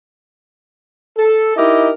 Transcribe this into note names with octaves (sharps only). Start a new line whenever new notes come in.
A4
D#4 E4 G4 A#4 D#5